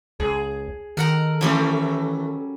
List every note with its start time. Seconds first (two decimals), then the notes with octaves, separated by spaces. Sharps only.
0.20 C#2 G#4
0.97 D#3 A4 A#4 F#5 A#5
1.41 E3 F#3 G3 A3 C#4